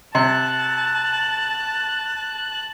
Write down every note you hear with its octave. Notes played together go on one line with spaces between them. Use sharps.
C3 A5 F#6